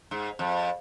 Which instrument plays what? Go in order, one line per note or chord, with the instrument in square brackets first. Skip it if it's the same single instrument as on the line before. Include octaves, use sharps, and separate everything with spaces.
[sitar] G#2
F2